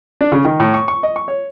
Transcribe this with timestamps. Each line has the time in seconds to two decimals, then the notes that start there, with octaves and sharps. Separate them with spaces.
0.21 D4
0.32 C#3
0.45 D#3
0.60 A2
0.74 C#6
0.88 C#6
1.03 D#5
1.16 C#6
1.28 C#5